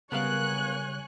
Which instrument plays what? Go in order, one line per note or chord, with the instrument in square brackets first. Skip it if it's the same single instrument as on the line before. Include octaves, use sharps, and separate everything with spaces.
[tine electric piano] C#3 G3 [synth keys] B3 A#4 F5 [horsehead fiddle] C#5 G#5 [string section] F#6